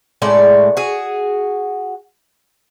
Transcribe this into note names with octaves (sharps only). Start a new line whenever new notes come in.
A2 G#3 A3 D5
F#4 G#4